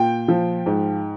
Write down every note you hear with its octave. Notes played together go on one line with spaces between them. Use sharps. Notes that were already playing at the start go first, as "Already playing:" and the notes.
Already playing: A#2 G5
F3
G#2